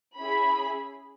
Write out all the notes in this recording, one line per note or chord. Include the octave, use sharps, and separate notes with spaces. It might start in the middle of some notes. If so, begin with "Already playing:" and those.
C#4 E4 G#4 B5